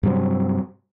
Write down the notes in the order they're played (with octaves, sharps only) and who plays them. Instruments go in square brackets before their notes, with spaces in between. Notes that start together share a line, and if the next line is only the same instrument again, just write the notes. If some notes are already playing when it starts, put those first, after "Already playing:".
[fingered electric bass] G2 C3 F#3 C4